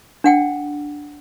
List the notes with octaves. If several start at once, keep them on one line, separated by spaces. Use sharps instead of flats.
D4 F#5 G5